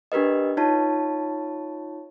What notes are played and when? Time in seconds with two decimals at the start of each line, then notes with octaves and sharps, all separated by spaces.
0.12 D4 G4 A#4 B4 D#5
0.57 D#4 F4 C#5 A5